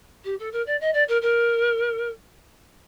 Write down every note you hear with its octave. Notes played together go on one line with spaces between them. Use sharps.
G4
A4
A#4
D5
D#5
D5
A#4
A#4